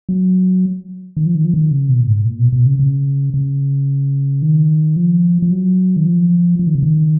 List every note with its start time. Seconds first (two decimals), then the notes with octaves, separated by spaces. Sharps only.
0.09 F#3
1.17 D#3
1.26 F3
1.35 D#3
1.45 F3
1.54 D#3
1.71 C#3
1.89 B2
2.00 A#2
2.07 G#2
2.25 A#2
2.39 B2
2.52 B2
2.66 C#3
2.79 C#3
3.34 C#3
4.42 D#3
4.96 F3
5.42 F3
5.51 F#3
5.96 D#3
6.06 F3
6.59 F3
6.67 D#3
6.75 C#3
6.83 D#3